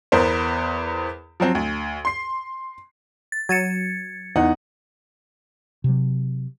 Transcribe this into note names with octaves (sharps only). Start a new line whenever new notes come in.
E2 B3 A#4 C5
F3 F#3 C4
D2
C6 C7
A6
F#3 G#6 A6 C#7 D#7 E7
E2 D#4 F#5
C3 F#3